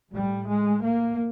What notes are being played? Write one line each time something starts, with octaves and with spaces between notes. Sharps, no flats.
A2 G3
G#3
A#3